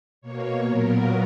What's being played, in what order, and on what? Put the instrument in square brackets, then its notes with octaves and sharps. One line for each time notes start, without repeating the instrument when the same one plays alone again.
[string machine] B2 A#3 C#5
A#2 F#3 B3 A#4